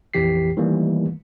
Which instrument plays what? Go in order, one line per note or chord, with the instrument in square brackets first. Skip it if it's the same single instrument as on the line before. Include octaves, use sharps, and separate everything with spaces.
[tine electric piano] A#1 F2 E3 G4 B6 C7
D#3 E3 G3 A3 A#3